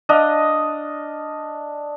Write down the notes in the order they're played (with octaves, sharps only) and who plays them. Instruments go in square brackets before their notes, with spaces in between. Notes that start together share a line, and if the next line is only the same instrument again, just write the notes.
[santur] D4 D#5 F5 D#6